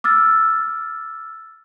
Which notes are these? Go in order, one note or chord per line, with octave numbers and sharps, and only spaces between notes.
D6 E6 F6 A6